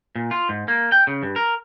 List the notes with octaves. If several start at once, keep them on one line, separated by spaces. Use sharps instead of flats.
A#2
F4
G#2
A#3
G5
C#3
G2
A#4